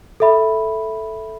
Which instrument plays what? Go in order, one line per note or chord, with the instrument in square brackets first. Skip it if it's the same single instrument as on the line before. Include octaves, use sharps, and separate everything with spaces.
[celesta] A4 E5 B5